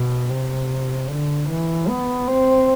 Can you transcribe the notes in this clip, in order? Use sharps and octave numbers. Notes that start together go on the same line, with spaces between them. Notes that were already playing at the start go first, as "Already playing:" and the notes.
Already playing: B2
C3
D3
E3
B3
C4